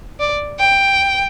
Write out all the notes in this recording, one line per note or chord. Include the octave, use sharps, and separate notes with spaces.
D5
G5